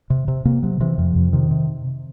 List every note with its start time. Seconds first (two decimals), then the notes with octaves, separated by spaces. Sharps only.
0.10 C3
0.28 C3
0.45 C3 A#3
0.63 C3 F#3
0.80 C3 E3
0.98 F2 F3
1.15 F2
1.33 C3 D#3
1.51 C3